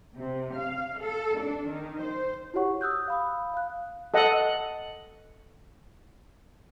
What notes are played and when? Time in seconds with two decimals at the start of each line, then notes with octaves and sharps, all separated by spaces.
0.16 C3
0.57 F5
1.01 A4
1.39 D4
1.69 D#3
2.04 C5
2.54 E4 F#4 G4 C#5 F#5 C#6
2.81 D#6 E6 F#6 G6
3.08 F5 B5 D#6
3.54 F5 F#6
4.14 A4 D#5 F#5